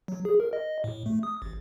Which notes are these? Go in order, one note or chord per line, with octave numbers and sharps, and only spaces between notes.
F#3
G#4
A#4
D#5
A2
A3
D#6
A1